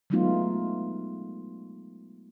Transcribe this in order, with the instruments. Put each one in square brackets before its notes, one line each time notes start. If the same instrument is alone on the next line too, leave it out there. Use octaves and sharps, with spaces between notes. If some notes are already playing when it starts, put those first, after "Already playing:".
[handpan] F#3 G#3 A3 B3 D#4 F4